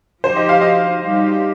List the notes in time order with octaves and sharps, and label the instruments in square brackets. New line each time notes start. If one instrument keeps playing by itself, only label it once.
[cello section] F3 D#4 G4 [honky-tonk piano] C5
[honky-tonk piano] D#5
F5
D#5
[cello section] G3 D#4 G4